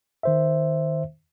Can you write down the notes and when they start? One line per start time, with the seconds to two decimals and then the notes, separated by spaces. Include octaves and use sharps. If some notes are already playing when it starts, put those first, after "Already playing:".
0.23 D#3 C5 E5